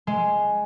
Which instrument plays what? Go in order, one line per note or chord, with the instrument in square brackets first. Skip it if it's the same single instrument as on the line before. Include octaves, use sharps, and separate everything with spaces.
[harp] G#3